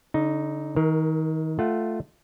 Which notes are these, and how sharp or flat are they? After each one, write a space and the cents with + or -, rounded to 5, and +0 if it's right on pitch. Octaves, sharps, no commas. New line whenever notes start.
D3 -35 D#4 +0
D#3 +30 A#4 +0
A3 +0 F4 +0 F#5 +20